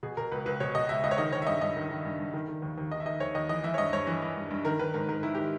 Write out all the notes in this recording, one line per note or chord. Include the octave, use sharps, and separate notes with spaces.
B2 G#4
B2 A#4
C#2 B4
C#2 B4
B2 C#5
B2 D#5
C#2 E5
C#2 D#5
C#5
D#3 D#5
D#3 C#5
E5
G2 D#5
G2 D#5
D#3
D#3
G2
G2
D#3
D#3
D#2
D#2
D#3 D#5
E5
D#3 D#5
D#2 C#5
D#2 D#5
E3 D#5
E3 E5
C#5
G2 D#5
G2 C#5
E3
E3
G2
G2
D#3 A#4
D#3 B4
G#2 A#4
G#2 A#4
D#3 E4
D#3 G4